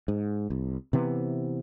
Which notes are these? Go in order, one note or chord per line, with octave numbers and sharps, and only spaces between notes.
G#2
C2
C3 E3 B3